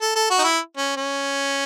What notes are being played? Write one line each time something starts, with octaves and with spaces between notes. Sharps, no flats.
A4
A4
F#4
D#4
E4
C#4
C#4